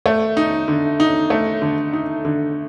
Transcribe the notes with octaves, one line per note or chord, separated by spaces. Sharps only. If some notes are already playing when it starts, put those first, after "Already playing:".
A3
D#4
D3
D#4
A3
D3
D#4
D3